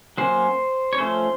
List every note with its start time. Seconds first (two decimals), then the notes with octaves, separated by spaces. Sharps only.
0.18 F#3 A#3 C#4 C5
0.93 C#5
0.98 F3 A3 C#4 C5